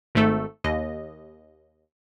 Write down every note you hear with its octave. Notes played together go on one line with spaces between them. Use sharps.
G#1 G#2 A3 A4
D#2 D#5